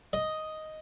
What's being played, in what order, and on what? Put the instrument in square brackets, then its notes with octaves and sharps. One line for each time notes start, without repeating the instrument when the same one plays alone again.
[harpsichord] D#5